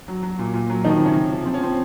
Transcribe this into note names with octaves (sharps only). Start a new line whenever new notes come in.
F#3
F#3
A#2
A#2
F#3
D#3 F3 D#4
C3
C#3 C#4
F3
F3
F3 C4
C#4
F3 C4